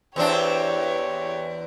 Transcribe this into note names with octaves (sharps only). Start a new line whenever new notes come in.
E2 C4 D4 G4 C#5